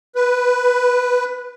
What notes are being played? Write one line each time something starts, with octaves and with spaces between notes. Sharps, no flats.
B4